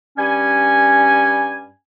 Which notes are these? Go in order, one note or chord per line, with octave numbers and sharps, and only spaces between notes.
G2 G3 C#4 G#5